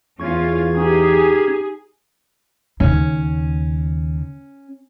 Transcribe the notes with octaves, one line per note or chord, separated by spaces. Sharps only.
E2 C#4 F4 C#6 G#6
C#4 D#4 G4 G#4 G#6
D#2 C#3 C#4